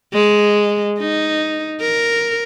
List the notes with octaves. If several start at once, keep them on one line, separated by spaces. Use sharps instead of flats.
G#3
D#4
A#4